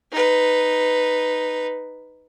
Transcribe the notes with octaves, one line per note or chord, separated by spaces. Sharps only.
D#4 B4